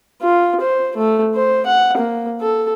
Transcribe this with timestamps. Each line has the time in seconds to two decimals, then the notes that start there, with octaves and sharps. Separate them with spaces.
0.22 F4
0.60 C5
0.97 A3
1.35 C5
1.66 F#5
1.97 A#3
2.41 A4